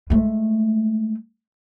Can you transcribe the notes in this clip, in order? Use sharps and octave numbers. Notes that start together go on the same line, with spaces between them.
G#3 A3